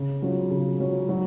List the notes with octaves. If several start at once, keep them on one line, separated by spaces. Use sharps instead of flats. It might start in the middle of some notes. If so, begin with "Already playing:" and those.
Already playing: C#3
F#3 C#4 F4
C#3
F#3 C#4 F4
F#3